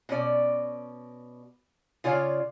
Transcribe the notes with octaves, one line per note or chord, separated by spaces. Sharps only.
B2 C#4 D5
C#3 F4 C#5 D5 F5